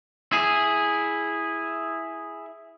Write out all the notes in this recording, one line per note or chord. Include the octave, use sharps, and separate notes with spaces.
E4 G#4